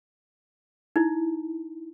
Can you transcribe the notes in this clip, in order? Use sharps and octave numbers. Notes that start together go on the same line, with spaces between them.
D#4 E4